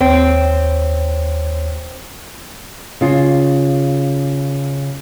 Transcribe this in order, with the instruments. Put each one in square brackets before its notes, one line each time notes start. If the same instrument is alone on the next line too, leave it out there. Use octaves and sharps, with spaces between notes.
[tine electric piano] D#2 C#5 [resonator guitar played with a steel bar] C4
[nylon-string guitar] C#3 F4